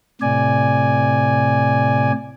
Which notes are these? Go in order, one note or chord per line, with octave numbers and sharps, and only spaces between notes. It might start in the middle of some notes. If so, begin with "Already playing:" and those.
A2 C3 D5 G#5